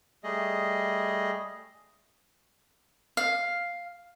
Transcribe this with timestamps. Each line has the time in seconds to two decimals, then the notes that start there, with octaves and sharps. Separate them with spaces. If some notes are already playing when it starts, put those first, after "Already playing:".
0.24 G3 A3 G#4 D#5
3.17 F5